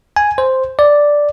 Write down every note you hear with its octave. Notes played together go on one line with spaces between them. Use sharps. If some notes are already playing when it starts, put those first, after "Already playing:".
G#5
C5
D5